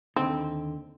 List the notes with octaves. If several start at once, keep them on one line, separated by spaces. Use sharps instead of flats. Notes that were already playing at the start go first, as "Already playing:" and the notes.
D#2 D3 C4 D#4